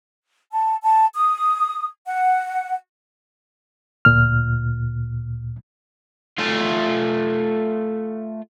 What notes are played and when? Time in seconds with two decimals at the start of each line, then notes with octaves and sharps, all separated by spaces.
0.52 A5
0.82 A5
1.15 D#6
2.06 F#5
4.05 D2 A#2 F6
6.38 A3 F4